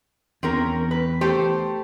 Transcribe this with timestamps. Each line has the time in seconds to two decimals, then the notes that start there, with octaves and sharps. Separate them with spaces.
0.43 E2 C4 C#4 A#4
0.91 B4
1.21 A3 G4 C5